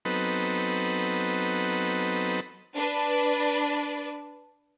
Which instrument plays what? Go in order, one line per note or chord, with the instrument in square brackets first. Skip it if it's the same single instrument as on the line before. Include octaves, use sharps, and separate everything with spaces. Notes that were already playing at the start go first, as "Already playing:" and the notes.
[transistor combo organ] F#3 B3 C4 D#4 A4 B4
[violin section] D4 B4